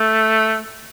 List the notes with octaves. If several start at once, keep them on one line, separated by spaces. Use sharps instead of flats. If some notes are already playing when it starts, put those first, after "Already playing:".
Already playing: A3